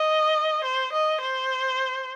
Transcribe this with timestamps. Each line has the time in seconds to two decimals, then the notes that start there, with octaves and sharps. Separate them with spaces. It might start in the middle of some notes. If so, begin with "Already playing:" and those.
Already playing: D#5
0.65 C5
0.93 D#5
1.21 C5